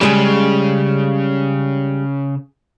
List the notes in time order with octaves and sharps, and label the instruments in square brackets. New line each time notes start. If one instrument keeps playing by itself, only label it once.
[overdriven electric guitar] C#3 [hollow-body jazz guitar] G3 G#3 G#4